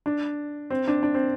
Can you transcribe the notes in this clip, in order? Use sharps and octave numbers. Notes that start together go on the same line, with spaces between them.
D4
C4
D4
D4
C4